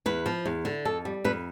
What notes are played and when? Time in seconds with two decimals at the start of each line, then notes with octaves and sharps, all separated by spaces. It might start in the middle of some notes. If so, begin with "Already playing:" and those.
0.06 E2 B4
0.26 F3
0.46 E2
0.65 D3
0.85 F2 A4
1.05 G3
1.24 F2 B4